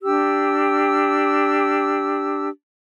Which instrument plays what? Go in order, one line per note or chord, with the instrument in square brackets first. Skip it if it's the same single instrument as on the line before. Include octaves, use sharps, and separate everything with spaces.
[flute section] D4 G4 E6